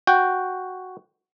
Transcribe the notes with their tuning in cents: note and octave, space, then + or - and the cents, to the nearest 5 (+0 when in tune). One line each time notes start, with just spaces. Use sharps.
F#4 +0 G5 +0